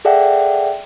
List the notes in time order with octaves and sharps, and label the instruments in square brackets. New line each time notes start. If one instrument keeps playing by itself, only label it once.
[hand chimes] G#4 A4 D5 E5 F#5 G5